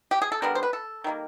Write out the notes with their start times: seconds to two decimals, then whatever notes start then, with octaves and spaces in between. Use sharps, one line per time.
0.11 G4
0.22 G#4
0.32 A4
0.42 D3 G3 B3 A#4
0.55 C5
0.63 B4
0.73 A4
1.04 D#3 G3 A#3